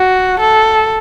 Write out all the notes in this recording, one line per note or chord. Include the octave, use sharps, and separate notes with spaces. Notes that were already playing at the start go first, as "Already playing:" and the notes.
Already playing: F#4
A4